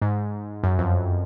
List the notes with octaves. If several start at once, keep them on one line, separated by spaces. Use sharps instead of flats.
G#2
F#2
F2